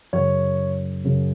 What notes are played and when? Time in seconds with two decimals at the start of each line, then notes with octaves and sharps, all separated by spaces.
0.13 F#2 C#3 F#3 C#5
1.04 F#2 C#3 F#3